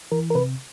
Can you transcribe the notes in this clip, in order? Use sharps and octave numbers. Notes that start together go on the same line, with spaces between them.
E3 A#4
A#4
C3 B4